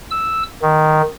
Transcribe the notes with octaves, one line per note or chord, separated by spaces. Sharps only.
E6
D#3